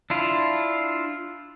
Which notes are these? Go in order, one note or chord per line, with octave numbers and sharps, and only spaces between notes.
D4 E4 F4